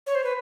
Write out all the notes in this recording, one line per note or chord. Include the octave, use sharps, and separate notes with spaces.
C#5
C5
B4